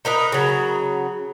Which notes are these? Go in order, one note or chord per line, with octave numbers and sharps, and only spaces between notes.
D#4 A#4 B4 D#5
C#3 F#3